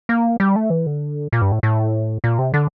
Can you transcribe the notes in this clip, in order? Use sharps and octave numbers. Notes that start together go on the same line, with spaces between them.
A#3
G3
A3
E3
D3
A#2
G2
A2
A2
A#2
C3
D3